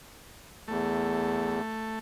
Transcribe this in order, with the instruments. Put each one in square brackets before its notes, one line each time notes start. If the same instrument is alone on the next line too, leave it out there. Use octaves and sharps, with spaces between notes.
[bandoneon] E2 [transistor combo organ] A3